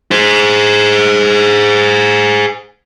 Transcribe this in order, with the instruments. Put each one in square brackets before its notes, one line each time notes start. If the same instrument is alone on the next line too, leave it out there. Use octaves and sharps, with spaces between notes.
[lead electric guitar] G#4 C5